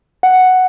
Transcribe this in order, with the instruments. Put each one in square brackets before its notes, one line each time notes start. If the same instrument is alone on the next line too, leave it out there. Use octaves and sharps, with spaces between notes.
[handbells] F#5